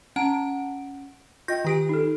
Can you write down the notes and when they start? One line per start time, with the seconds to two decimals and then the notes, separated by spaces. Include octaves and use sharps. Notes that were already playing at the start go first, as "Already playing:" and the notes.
0.16 C#4 F#5 A5 A#5 D7
1.48 F4 D#5 G5 G6 A#6
1.65 D#3 G4 D7
1.89 D#4 A4